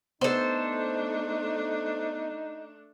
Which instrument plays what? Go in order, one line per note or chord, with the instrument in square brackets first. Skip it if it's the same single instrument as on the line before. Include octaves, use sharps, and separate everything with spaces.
[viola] A3 D4 [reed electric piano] B3 [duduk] D#4 [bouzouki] A4 C5